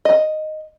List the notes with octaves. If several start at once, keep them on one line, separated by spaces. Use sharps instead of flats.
D#5